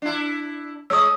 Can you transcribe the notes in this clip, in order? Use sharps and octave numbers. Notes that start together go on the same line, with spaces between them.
D4 E4
G#3 C#5 D#6 E6